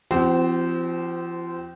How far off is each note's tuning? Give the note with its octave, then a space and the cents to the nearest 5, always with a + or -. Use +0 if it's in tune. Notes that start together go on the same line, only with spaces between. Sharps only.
F3 -30 C4 -15 F#4 +40